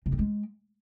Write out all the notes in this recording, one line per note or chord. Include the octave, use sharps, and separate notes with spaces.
C3
C4
G#3